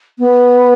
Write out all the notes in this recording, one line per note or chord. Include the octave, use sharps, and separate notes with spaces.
B3